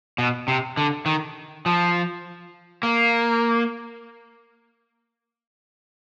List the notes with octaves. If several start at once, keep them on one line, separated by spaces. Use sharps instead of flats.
B2
C3
D3
D#3
F3
A#3